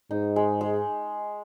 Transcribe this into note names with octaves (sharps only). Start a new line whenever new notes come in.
G#2 D#4
G#3
G#3